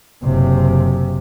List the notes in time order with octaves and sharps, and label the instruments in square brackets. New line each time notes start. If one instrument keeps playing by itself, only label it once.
[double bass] F#1 C3